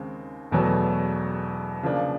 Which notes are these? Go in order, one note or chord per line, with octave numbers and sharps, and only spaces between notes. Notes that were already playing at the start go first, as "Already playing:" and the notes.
Already playing: D#2 C#3 G#3 C4
E1 E2 B2 F#3 A3
C#3 F3 A#3 D4